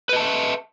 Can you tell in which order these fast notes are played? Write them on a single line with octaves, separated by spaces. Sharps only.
B4 D#5 A5 E5